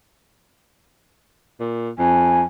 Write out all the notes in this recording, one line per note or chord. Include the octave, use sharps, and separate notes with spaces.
A#2
F2 G#5